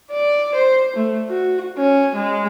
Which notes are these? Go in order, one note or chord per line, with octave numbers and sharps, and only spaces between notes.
D5
C5
A3
F#4
C#4
G#3